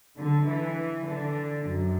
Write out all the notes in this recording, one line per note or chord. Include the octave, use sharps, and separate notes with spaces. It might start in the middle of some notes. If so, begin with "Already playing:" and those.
D3
E3
D3
F#2